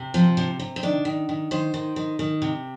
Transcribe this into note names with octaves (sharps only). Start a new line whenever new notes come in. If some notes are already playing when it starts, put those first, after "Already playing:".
Already playing: C3
F3 C4
C3
C3
C4
D#3 D4
D#3
D#3
D#3 C5
D#3
D#3
D#3
C3